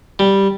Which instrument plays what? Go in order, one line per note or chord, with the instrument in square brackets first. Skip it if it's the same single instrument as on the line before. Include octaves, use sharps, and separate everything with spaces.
[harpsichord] G3